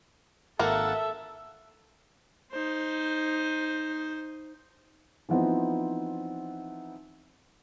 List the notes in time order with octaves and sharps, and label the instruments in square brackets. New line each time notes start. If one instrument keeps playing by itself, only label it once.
[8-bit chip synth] G#1 F#5 A6 [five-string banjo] A#3 A#4 [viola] A4 E5
[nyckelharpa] D#4 C5
[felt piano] E3 F3 B3 C4 D#4